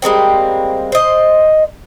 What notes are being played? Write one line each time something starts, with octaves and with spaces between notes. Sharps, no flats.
G3 G#3 A#3 C4
C5 D#5